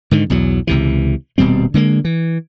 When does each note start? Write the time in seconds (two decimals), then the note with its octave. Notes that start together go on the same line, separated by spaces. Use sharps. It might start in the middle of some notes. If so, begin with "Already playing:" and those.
0.11 G#2 D3 D#3
0.30 B1 E2 F#3
0.67 C#2 C3 E3
1.38 D#1 B2 G3 C4
1.74 D3 G#3 A#3
2.05 E3